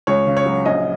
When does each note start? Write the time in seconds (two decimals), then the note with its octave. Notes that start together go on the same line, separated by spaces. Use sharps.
0.07 C#2 C#5
0.27 C#3
0.37 C#5
0.46 F#3
0.65 A#1 D#5